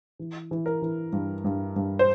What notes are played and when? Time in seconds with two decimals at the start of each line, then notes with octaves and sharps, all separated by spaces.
0.19 E3
0.51 E3
0.66 A#4
0.82 E3
1.12 G2
1.44 G2
1.76 G2
1.99 C5